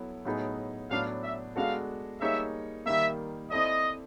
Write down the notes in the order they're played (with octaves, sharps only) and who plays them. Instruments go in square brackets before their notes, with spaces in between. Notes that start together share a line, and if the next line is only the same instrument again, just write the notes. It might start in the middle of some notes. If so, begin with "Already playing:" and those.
Already playing: [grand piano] F#3 B3 E4 A4
A2 F#3 B3 D#4 G#4
[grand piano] A2 F#3 B3 D4 [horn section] F5
[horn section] E5
[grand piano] G#3 B3 D4 F#4 A4 [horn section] F5
[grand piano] G3 A#3 D#4 G#4 C#5 [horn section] E5
[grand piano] D#3 G3 A#3 [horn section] E5
[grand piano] C4 E4 A4 D5 [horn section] D#5